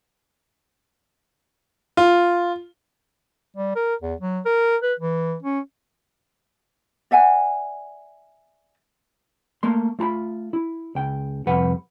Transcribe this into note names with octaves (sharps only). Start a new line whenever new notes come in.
F4
G3
A#4
E2
F#3
A#4
B4
E3
C#4
D5 E5 F#5 G#5
A3 A#3 C6
A3 F4 A#5 B5
E4
C#2 G5
C2 F2 B4 F#5